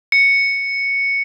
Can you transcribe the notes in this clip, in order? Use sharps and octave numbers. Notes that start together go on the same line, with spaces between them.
C#7